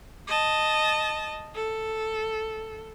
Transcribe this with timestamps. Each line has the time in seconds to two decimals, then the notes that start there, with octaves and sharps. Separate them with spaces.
0.27 D#5 A5
1.55 A4